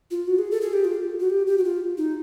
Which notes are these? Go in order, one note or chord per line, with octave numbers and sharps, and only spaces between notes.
F4
F#4
G#4
A4
G#4
G4
F4
F#4
G4
G4
F#4
F4
D#4